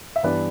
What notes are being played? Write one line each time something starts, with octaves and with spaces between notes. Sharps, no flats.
E5
G2 E3 G3 B3 B4 D5